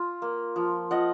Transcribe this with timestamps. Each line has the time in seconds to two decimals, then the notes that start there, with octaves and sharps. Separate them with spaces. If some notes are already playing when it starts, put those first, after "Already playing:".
Already playing: F4
0.22 A#3
0.56 F3
0.91 F3 D#5 F#5